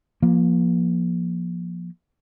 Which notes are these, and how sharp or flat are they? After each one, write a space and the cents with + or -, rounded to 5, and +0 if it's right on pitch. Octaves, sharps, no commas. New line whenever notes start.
F3 +0 A#3 +30